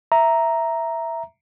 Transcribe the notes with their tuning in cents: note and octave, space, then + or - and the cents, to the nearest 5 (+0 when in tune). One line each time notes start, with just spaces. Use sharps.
E5 +0 A#5 +0